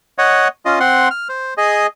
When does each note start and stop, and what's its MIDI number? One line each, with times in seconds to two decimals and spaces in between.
0.18 0.48 73
0.18 0.48 75
0.18 0.48 78
0.65 0.79 61
0.65 0.79 65
0.65 0.79 75
0.80 1.09 60
0.80 1.09 78
0.80 1.09 84
1.11 1.28 89
1.29 1.54 72
1.58 1.87 68
1.58 1.87 75